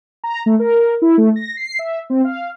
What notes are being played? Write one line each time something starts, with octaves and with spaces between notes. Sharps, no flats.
A#5
A3
A#4
E4
A3
A#6
C7
E5
C4
F5